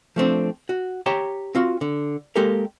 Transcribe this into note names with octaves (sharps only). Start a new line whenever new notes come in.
F3 A3 C4 D4
F#4
G4 C#5 G5 A5 A#5
C4 F4 F#4
D3
G#3 A#3 G4 A4 A#4